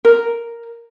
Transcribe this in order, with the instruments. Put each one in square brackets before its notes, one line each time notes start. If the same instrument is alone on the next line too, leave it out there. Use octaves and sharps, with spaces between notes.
[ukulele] A#4